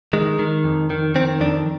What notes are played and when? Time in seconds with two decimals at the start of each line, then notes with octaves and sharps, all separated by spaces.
0.13 D#3 G#3
0.39 D#3
0.64 F2
0.90 D#3
1.15 D#3 C4
1.40 F2 D4